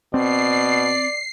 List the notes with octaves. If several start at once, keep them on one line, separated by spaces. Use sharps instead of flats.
B2 C4 D5 C7